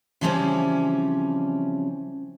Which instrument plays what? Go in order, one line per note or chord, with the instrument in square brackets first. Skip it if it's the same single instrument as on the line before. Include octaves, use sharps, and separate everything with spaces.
[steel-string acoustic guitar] C#3 E3 F3 G3 C4 C#4